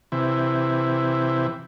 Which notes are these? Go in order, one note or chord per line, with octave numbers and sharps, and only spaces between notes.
C3 E3